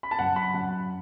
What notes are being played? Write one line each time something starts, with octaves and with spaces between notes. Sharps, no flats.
B5
A5
F#2 F#5
B5
F#2 F#5